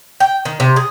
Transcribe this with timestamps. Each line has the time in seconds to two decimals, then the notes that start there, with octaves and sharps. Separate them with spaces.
0.20 G5
0.45 D#3
0.60 C3
0.76 G#4